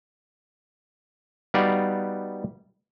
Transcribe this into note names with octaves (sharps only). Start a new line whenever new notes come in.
G3 B3 D#4 F#4 D5 F5